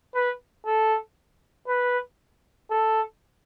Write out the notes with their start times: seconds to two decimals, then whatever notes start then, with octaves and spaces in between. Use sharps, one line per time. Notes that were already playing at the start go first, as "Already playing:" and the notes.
0.15 B4
0.66 A4
1.67 B4
2.70 A4